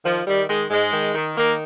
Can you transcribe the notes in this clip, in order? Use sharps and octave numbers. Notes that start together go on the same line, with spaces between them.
D#3 F3
D#3 G3
D#3 G#3
G#2 G#3
D#3
D#3
D#3 A#3